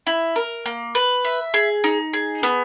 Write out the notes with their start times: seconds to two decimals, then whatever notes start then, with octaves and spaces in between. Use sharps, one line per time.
0.07 E4
0.36 A#4
0.66 A#3
0.95 B4
1.25 E5
1.54 G#4
1.84 D#4
2.13 G#4
2.43 B3